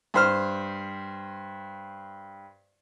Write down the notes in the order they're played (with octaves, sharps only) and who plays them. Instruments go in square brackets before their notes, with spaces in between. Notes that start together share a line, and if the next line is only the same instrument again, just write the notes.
[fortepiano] G2 C5 F6